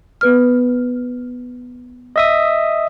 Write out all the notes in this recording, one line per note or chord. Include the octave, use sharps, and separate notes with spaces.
B3 B4 F6
D#5 E5 D#6